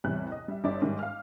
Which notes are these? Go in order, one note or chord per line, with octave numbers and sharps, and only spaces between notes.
A1 E2 C3 G3 F#6
D#5
G3 E5
G1 G3 D#4 D5 E5 D6
G#2 D#3 G3 G#3
F5 F6